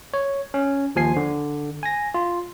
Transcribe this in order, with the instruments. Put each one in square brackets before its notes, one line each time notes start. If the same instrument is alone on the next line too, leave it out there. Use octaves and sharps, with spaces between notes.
[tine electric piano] C#5
C#4
D#2 F3 G#5 C7
D3
G#5 A#6
F4